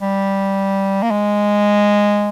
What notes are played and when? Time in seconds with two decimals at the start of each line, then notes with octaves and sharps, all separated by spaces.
0.01 G3
1.03 A#3
1.11 G#3